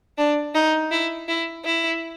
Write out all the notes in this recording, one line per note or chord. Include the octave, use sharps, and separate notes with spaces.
D4
D#4
E4
E4
E4